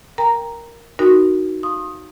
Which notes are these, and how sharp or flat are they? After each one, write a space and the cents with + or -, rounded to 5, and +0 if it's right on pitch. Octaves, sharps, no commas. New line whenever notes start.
A#4 +0 G5 +10 A#5 +0
D#4 +0 F#4 +0 A#4 +0
F5 +0 C6 +40 D#6 +0